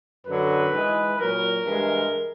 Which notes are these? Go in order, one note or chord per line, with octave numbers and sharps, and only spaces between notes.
F#2 D3 F#3 B4
G#2 E3 G#3
A#2 F#3 A#4
G2 E3 G#3